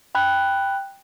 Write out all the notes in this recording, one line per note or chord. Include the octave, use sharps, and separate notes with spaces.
G5 B5 F#6